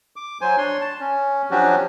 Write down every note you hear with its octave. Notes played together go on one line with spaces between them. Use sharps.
D6
F#3 C5 G#5
D4 C#5 C6
A5
C#4
F3 F#3 C#4 D4 F#4 G4